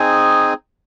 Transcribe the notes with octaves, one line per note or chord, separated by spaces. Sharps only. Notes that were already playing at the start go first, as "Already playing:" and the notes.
Already playing: C4 D#4 G#4 G#5